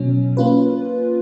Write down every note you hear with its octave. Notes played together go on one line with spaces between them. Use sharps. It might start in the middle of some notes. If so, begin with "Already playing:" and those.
Already playing: B2 F#3 C#4
A#3 C#4 F4 B4